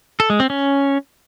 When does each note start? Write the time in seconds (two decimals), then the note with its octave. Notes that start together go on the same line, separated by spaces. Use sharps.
0.20 A4
0.30 G#3
0.40 C4
0.50 C#4